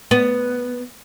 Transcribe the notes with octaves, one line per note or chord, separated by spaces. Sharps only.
B3